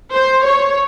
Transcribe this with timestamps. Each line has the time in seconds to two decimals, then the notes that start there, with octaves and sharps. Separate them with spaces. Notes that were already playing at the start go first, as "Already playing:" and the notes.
0.15 C5
0.46 C#5